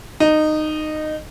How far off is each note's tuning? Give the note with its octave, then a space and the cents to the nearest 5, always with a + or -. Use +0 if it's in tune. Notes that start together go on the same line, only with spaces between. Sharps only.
D#4 -15